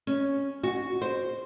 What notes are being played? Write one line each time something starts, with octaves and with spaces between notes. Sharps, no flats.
C#4
F#4
C5